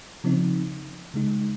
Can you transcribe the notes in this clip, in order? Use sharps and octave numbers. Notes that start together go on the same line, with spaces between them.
C#3 F3 C4 D#4
C#3 G#3 D#4